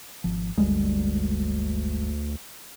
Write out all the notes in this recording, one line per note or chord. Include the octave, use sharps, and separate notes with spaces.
G#1 F3
G1 D2 G3 G#3